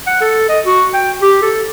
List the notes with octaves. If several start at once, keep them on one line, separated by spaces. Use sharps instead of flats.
F#5
A4
D#5
F#4
G5
G4
A4